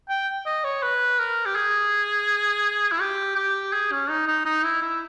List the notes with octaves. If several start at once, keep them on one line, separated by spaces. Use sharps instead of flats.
G5
D#5
C#5
B4
A#4
G4
G#4
E4
G4
G4
G#4
C#4
D#4
D#4
D#4
E4
E4